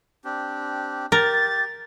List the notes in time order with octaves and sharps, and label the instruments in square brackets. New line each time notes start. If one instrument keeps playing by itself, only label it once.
[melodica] C4 D4 G4
[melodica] G4 [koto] A#4 [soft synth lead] A6